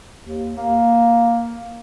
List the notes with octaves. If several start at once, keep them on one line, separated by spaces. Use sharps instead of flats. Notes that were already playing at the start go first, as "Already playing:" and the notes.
D#2
A#3